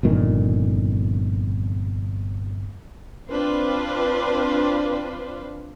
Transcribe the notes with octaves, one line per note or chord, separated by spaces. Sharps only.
G1 F2 A#2 D#3
C4 D4 F4 B4 C5